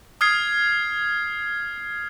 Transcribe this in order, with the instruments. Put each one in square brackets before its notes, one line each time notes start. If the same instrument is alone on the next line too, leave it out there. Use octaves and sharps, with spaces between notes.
[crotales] D#6 F6 G#6 C7